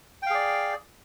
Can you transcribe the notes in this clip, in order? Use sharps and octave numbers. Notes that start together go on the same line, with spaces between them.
G#4 D5 F5 G5